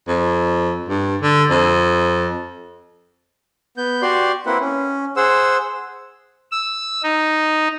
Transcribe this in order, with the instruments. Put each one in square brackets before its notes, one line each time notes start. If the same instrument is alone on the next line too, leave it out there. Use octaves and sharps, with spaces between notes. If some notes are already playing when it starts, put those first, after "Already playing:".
[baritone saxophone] F2
G2
D3
F2
[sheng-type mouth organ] B3 G6
F#4 G4 D5 C6
A#3 C4 E4 B4 F#5
C#4
G#4 C5 F#5 E6
[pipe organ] E6
D#4